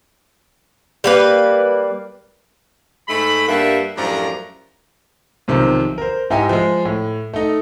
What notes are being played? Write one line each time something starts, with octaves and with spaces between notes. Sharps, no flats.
G3 A#3 B4
G#2 G#3 A3 B5
G2 G3 A#3 E5 F#5 A5
F#2 A2 F3 G3 D4 A#5
B1 C3 D#3 F3
A#4 C5
G#2 E4 G4 D#5 G#5
F3 G#3
A2
A3 D#4